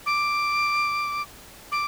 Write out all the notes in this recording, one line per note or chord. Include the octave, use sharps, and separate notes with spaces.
D6
D6